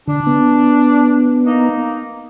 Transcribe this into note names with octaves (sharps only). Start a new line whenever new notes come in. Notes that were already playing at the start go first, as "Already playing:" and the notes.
D3 D4
B3
A#3 D#4